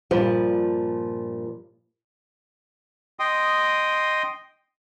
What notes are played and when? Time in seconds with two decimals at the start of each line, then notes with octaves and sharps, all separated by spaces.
0.11 G2 A#2 F3 G3
3.19 D#5 G5 C6 D#6